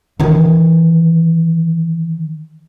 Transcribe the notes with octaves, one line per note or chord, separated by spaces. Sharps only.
D#3 E3